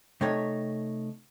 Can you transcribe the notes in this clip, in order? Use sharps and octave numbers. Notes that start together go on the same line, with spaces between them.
C3 A3 D#4 C#5